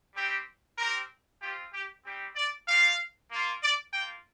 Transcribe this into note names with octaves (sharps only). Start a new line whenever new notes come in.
G3 C4 G4
C4 G4 A#4
C4 F4 G4
G4
G3 C4 G4
D5
G3 C4 F4 F5
A#3 F4
D5
A#3 F4 G5